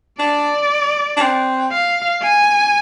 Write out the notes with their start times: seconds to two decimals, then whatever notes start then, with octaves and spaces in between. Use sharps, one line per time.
0.19 D4 D5
1.16 D4
1.22 C4
1.72 F5
2.23 G#5